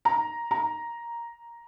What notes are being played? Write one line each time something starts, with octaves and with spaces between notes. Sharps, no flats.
A#5
A#5